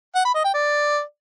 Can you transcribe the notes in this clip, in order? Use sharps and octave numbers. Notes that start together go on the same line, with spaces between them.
F#5
B5
D#5
G5
D5